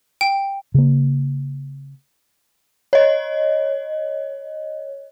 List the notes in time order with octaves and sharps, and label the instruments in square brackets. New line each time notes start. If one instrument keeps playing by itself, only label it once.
[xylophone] G5
[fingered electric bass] C#3 A#3
[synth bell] C#5 D#5